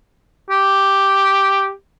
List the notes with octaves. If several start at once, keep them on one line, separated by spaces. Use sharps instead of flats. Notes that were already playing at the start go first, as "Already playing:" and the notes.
G4